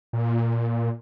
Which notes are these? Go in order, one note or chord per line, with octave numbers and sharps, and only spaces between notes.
A#2